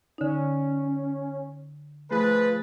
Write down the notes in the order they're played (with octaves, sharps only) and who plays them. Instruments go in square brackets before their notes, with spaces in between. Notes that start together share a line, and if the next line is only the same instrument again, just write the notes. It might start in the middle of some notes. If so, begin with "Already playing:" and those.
[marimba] D3 D#4 [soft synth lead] C#4
[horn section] F3 G#4 B4 [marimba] A3 [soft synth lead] A6